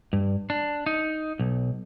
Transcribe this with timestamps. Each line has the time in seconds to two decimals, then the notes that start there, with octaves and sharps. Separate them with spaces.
0.13 G2
0.50 D4
0.86 D#4
1.39 B1